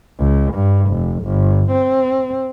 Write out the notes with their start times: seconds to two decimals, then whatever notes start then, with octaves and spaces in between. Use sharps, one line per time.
0.19 C#2
0.54 G2
0.91 F1
1.23 G1
1.71 C4